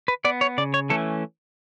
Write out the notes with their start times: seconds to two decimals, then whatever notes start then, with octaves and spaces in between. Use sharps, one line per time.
0.08 B4
0.25 B3 D5
0.41 C#5
0.58 C#3 D5
0.74 C#5
0.90 E3 A3 C#4 A4